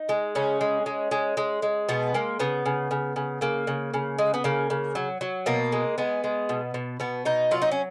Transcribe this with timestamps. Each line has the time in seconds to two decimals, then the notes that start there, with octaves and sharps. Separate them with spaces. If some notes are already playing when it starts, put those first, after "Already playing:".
Already playing: D#4
0.09 G#3
0.35 C#3 C#4
0.61 G#3
0.86 G#3
1.11 G#3
1.37 G#3
1.62 G#3
1.89 B2 B3
2.14 G#3 A#3
2.39 C#3 B3
2.66 C#3
2.91 C#3
3.16 C#3
3.41 C#3 A#3
3.67 C#3
3.94 C#3
4.19 G#3
4.34 B3
4.44 C#3 A#3
4.70 C#3
4.95 F#3
5.21 F#3
5.46 B2 A#3
5.72 G#3
5.98 G#3 B3
6.24 G#3
6.49 B2
6.74 B2
7.00 B2 B3
7.25 B2 D#4
7.51 F#3 F4
7.62 D#4
7.72 C#4